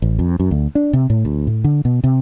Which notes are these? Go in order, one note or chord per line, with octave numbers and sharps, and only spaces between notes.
A1
F2
F#2
D2
D4
C3
A2
D2
A2
D3
B2
C3